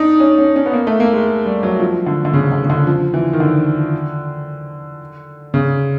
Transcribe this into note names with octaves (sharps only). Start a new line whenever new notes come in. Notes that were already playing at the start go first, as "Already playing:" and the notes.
Already playing: D4 D#4
C#4
C#4
C#4
B3
A#3
A3
A#3
G#3
G3
F#3
F3
D3
D3
C#3
D3
C#3
D3
F3
E3
D#3
D3
C#3